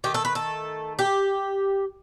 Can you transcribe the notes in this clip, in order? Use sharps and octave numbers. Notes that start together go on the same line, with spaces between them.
D#3 A3 G4
A4
B4
A4
G4